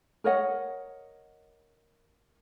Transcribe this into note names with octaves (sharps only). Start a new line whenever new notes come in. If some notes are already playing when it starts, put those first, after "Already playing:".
A#4 C#5 D#5 F#5